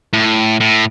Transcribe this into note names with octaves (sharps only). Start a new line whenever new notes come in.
A2
A2